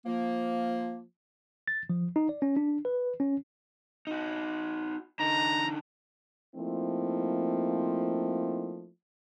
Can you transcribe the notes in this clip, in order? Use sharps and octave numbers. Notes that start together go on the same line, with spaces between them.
F3 A#3
A6
F3
D#4
D5
C#4
D4
B4
C#4
D#4 F#4
D3 D#4 A#5
F3 A3 A#3 C4 D#4 E4